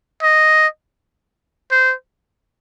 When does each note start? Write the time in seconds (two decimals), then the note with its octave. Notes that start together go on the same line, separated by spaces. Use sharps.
0.22 D#5
1.71 C5